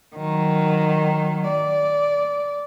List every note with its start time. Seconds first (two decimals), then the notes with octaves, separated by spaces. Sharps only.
0.16 D#3 F#3
1.49 D5